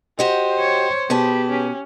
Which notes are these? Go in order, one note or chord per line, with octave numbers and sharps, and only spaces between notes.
F#4 G4 C5 D#5
C#5
B2 G4 G#4 B4 A5
C#4